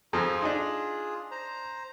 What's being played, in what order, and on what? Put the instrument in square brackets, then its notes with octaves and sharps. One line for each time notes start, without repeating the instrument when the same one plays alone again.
[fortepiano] F2 F3 [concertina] F4 G#4
[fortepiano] D4 D#4
[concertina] C5 A#5